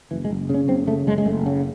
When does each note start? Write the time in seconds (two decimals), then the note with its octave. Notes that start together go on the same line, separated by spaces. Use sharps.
0.11 F#1 E3
0.25 G#3
0.31 F#1
0.50 C#3 C#4
0.68 F#1 C4
0.87 C#3 A3
1.07 F#1 G#3
1.18 G#3
1.26 F#1 A3
1.46 C#3